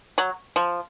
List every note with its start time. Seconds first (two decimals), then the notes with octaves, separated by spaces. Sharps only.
0.18 F#3
0.56 F3